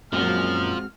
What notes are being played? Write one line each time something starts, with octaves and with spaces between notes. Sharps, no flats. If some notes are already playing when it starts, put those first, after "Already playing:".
F#2 A#2 F3 G#3 C4 F#4 F6